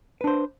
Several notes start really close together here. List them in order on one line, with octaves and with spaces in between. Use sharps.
B4 D4 C5